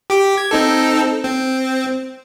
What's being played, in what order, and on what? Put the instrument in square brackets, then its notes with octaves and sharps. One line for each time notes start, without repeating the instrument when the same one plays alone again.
[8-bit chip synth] G4 D6
G#6
C4 D#4 A4
C4